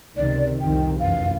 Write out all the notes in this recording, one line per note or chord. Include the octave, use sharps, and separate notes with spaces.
C#2 C3 D#3 D5
C2 F2 D#3 G5
F1 F#2 E3 F5